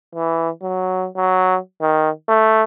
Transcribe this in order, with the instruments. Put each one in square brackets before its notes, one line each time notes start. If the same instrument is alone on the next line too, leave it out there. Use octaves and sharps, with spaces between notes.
[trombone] E3
F#3
F#3
D#3
A3